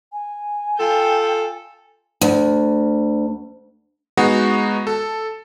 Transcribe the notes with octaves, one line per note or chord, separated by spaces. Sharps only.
G#5
F4 A4 G5
D2
G#3 B3 D#4 F#4
A4